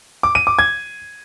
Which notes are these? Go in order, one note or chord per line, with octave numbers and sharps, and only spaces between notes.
D6
D#7
D6
G#6